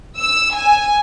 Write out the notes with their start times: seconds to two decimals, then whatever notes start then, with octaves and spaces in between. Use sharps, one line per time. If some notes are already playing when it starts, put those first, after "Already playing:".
0.20 E6
0.56 G#5